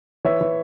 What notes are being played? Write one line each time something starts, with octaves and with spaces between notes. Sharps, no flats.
E3 C#5 E5
E3